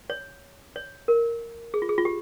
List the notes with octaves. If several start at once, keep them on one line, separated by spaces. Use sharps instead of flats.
C#5
C#5
A#4
G#4
F4
G#4
F4
G4